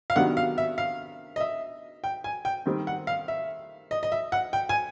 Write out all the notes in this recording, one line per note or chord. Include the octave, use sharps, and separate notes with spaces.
F5
C3 D#3 F#3 B3 D4 F#5
F5
E5
F5
D#5
E5
G5
G#5
G5
D#3 G3 C4
F#5
F5
E5
D#5
D#5
E5
F#5
G5
G#5